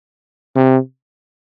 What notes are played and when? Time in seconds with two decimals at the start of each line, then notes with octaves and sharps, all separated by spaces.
0.56 C3